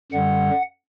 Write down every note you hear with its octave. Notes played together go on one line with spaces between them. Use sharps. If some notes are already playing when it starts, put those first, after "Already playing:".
F#2 D3 G3 F#5